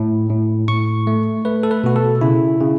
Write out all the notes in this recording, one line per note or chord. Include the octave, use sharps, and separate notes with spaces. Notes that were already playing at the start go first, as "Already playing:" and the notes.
Already playing: A2
A2
A2 C#6
A3
A3 B4
A4
B4
B2 F#4
A4
C#3 E4
C#3